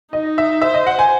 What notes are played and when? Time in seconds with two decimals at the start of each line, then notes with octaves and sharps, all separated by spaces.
0.13 D#4 D#5
0.38 E5
0.61 C5 E5
0.74 D#5
0.87 F#5
0.99 G#5